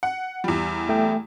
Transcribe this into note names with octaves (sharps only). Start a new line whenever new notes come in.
F#5
E2 G3
A3 G5